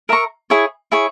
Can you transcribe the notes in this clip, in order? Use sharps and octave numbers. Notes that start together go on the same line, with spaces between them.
A#4 E5 A#5 C#6
E4 G#4 C#5
E4 G#4 C#5